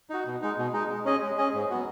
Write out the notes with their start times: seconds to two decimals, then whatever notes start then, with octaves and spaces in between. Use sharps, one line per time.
0.10 D#4 F#4
0.26 B2
0.42 G#3 D#4
0.58 B2
0.73 G#3 D#4
0.90 G#3
1.05 C#4 G#4 D#5
1.22 G#3
1.38 C#4 G#4 D#5
1.54 G#2
1.70 F#3 B3 F#4